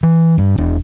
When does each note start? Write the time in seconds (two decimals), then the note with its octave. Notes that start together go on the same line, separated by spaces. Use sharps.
0.03 E3
0.38 G2
0.58 E1 D4